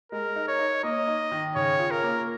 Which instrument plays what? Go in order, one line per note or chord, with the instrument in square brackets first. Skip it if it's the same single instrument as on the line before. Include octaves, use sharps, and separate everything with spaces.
[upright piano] G#3 [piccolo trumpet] A#4
[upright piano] D#4
[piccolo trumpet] C#5
[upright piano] D#4
[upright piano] A#3 [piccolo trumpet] D#5
[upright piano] D#4
D#3
[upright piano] C#3 [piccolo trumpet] C#5
[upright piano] F4
[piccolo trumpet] A#4
[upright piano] A#3